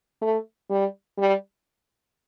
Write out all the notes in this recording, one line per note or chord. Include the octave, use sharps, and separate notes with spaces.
A3
G3
G3